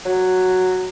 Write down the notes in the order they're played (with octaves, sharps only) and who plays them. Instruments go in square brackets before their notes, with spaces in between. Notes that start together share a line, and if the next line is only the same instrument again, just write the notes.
[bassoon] F#3